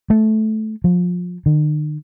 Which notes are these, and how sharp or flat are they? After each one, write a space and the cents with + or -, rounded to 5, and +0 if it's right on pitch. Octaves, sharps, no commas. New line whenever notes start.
A3 -15
F3 +30
D#3 -45